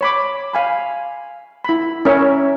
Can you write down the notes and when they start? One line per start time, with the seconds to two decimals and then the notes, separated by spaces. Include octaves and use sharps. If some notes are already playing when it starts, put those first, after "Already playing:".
0.01 C#5 B5 D6
0.54 F5 G#5 B5
1.64 E4 B5
2.05 C#4 A#4 C#5 E5